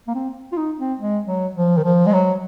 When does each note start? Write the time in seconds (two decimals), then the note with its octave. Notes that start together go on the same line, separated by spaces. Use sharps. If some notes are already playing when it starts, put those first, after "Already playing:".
0.08 A#3
0.15 C4
0.52 F4
0.57 D#4
0.79 C4
0.99 G#3
1.28 F#3
1.56 F3
1.77 D#3
1.84 F3
2.07 G#3
2.13 F#3